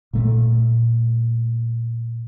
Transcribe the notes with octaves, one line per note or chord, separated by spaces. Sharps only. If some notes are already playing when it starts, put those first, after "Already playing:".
A#2 A3